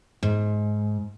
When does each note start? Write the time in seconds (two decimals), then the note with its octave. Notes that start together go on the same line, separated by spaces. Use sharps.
0.23 G#2